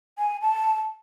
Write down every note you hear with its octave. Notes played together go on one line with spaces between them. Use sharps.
G#5
A5